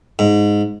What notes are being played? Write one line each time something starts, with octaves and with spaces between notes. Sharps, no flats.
G#2